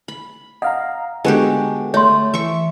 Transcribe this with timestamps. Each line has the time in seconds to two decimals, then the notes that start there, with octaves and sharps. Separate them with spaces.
0.08 B5
0.62 D#5 F5 F#5 A#5
1.25 D3 G#3 B3 F#4 G4 A4
1.94 A3 C#5 C6
2.34 E3 E5 C#6